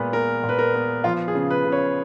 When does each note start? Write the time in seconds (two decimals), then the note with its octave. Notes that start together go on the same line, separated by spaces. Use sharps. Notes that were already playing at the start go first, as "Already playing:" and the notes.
Already playing: A#2 G#3 B3 B4
0.13 B3 A#4
0.43 A#2
0.49 B4
0.59 A#4
0.75 B3
1.04 F3 F4
1.28 G#4
1.35 C#3
1.51 B4
1.65 C#3
1.72 C#5